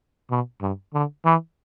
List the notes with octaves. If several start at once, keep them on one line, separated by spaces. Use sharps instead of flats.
B2
G2
D3
E3